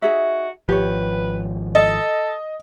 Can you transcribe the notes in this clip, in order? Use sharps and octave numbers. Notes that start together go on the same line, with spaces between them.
D#4 F#4 G#4 E5
G#1 F3 G4 B4 C#5
A4 D#5